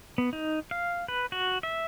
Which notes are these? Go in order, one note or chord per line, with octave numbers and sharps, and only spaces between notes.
B3
D#4
F5
B4
F#4
E5